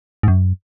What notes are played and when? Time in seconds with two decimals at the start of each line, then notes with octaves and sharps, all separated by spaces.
0.23 G#2
0.28 F#2